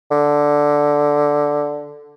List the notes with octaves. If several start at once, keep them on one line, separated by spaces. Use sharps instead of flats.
D3